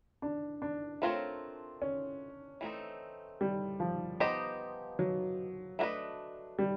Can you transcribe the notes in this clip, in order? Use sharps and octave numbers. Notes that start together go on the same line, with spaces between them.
D4
D4
A3 C4 F4 A#4 C#5
C#4
E3 A3 C4 D#4
G3
F3
B3 D#4 G4 C5 D#5
F#3
A3 D4 F#4 B4 D#5
G3